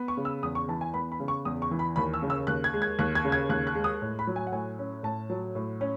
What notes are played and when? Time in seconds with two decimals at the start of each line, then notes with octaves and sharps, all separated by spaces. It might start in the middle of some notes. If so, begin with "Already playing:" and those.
Already playing: B3
0.08 C#6
0.17 C#3
0.25 E6
0.43 E2 D#6
0.55 C#6
0.68 E3 A5
0.81 G#5
0.94 B3 B5
1.12 B5
1.20 C#3
1.28 C#6
1.45 E2 D#6
1.62 C#6
1.71 E3
1.79 B5
1.96 D#2 B5
2.14 E6
2.22 C#3
2.30 E6
2.47 D#2 F#6
2.64 G#6
2.73 G#3
2.82 G#6
2.99 D#2 F#6
3.15 G#6
3.25 C#3
3.32 G#6
3.49 D#2 F#6
3.67 F#6
3.75 G#3
3.84 D#6
4.02 A2
4.19 B5
4.27 F#3
4.36 G#5
4.47 F#5
4.52 A2 G#5
4.79 C#4
5.03 A2 A5
5.30 F#3
5.55 A2
5.81 C#4